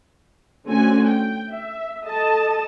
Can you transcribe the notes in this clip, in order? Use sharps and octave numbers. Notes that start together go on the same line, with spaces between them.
D3 A3 C4 C#4 F#4 G#5
G5
E5
A4 D#5 A5